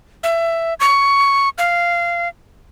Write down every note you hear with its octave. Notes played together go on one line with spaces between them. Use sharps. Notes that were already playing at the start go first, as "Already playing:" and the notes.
E5
C#6
F5